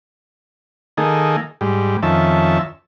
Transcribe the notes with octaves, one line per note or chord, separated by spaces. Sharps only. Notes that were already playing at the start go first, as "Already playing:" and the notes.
D#3 A#3 D#4 G#4 A4
G#2 G3
F2 D#3 C#4 E5 A5